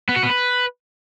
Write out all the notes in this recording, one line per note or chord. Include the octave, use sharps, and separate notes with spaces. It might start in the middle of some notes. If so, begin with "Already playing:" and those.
B3
F#4
B3
B4